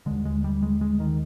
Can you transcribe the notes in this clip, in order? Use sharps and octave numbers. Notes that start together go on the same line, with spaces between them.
D#2 D3 G#3
G#3
G3
G#3
G#3
D#3